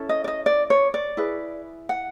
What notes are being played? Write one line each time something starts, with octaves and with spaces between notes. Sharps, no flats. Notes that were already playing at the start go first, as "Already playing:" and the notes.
Already playing: C#4 E4 A4
D#5
D5
D#5
D5
C#5
D5
E4 G#4 B4
F#5